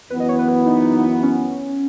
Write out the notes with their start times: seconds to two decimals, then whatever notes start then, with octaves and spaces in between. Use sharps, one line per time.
0.10 F#2 E3 B3 B4
0.20 D#5
0.29 C#5
0.39 B4
0.48 E4
0.66 D#4
1.23 C#4